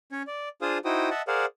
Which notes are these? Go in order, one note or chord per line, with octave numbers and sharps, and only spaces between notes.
C#4 C#5
D5
D4 F4 G#4 C5 F5 D#6
D#4 E4 F#4 C5 G5 D#6
D#5 E5 F#5 A5
G#4 A#4 C5 D5 F5 F#5